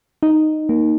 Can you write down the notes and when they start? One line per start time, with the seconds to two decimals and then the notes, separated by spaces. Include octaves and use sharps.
0.23 D#4
0.69 A#3